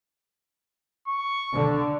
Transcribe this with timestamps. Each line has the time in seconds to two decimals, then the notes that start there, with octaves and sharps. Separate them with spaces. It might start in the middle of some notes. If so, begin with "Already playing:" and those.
1.08 C#6
1.54 D3